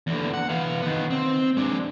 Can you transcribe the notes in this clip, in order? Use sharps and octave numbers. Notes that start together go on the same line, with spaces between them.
E2 D3
F#5
E3 F5
D#3 B3
C4
G#3 D4